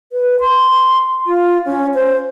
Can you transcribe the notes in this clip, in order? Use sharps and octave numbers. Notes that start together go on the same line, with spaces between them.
B4
C6
F4
C#4
C5